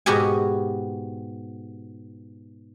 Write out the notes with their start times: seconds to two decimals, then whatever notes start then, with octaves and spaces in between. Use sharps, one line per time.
0.06 G#2 B2 F#4 G4 G#5